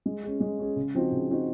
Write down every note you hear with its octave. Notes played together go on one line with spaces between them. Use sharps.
G#3
C#4 G#4
G#3
C#4 G#4
C#3
F3 C4 D#4 F#4
C#3
F3 C4 D#4 F#4